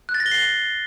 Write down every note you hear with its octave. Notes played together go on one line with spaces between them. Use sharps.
F#6
A6
A#6
G7
C7